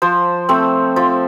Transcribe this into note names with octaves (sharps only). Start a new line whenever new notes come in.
F3 C5
A3 C4
F3